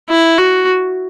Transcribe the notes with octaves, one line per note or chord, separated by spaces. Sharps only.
E4
F#4